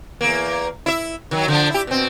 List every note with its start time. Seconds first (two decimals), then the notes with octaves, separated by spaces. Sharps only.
0.21 E2 A#3
0.86 E4 E5
1.31 D#3 F3 F#3
1.48 D3 F3 D4
1.70 E4 G4
1.87 B2 C4